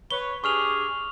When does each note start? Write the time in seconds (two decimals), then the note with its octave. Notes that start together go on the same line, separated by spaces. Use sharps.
0.11 B4 C#5 G7
0.44 D4 G4 G#4 C#6 F6 F7